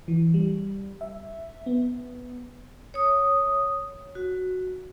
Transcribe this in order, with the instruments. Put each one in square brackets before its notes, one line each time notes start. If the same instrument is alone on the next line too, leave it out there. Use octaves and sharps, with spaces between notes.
[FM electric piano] E3
G3
E5
B3
[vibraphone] C#5 D#6
F#4